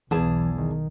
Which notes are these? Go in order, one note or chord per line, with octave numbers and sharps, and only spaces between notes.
B1 E2 E3 G#4 A5
D#3